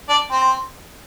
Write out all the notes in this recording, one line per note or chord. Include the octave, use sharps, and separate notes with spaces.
D4 D5
C4 C5